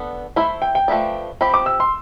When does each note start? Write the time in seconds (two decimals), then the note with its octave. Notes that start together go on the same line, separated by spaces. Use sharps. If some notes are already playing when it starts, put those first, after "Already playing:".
Already playing: B3 D4 A4
0.36 A3 E4 A4 C5 E5 B5
0.62 G5
0.75 G5
0.88 F3 A3 E4 B4 D5
1.41 F3 C4 G4 B5
1.54 D6
1.66 E6
1.80 C6